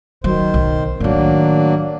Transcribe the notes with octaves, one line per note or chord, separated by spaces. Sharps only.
D#3 F#3 C5
B1
A2 D#3 F#3 A#3 D4